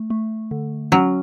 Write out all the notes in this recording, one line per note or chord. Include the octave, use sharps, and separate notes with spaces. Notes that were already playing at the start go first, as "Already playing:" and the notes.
Already playing: A3
A3
D3
F#3 C#4